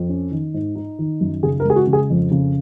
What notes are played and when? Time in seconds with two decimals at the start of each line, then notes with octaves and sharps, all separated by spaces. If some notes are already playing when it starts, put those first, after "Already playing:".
Already playing: F2
0.09 C#4
0.31 D#3
0.54 G#2
0.76 D#4
0.99 D#3
1.21 F#2
1.43 C#3 G#4
1.60 A#4
1.65 G#3 G#4
1.76 F#4
1.87 C#3
1.93 G#4
2.10 F2
2.31 C#3